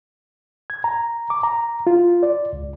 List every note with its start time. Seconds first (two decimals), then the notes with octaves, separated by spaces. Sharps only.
0.70 G#6
0.84 A#5
1.30 D6
1.43 A#5
1.87 F4
2.23 D5
2.53 C#2